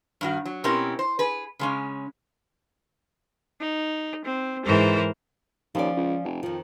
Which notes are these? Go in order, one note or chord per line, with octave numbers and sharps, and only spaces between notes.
G2 D#3 F#4
F#3
B2 C4 C#4 E4 G4 A#4
C5
G#4 B4
C#3 G#3 C#4
D#4
C4
G#2 E3 A#4 C5
D#2 F3 C#4 D5
C#2
F1
F2 D#3 F3